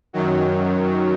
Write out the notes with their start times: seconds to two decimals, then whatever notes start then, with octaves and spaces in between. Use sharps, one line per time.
0.13 F#2 D#3 F#3